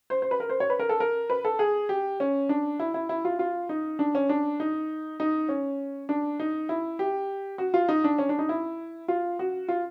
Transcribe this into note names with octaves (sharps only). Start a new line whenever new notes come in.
C5
C5
B4
A#4
C5
C#5
B4
A#4
A4
A#4
B4
A4
G#4
G4
C#4
D4
E4
E4
E4
F4
F4
D#4
D4
C#4
D4
D#4
D#4
C#4
D4
D#4
E4
G4
F#4
F4
D#4
D4
C#4
D4
D#4
E4
F4
F#4
F4